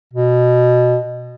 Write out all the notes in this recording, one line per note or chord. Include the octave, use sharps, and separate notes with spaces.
B2